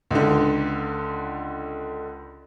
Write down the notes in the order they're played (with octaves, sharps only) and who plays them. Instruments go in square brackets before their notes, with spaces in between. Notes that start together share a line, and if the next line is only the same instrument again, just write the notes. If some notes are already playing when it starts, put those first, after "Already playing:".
[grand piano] C#2 D3